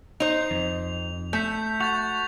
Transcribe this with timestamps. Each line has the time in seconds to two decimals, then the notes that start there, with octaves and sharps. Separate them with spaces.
0.20 D#4 C5 F7
0.51 F2
1.33 A3 G6 B6
1.80 F#4 G6 A6 F7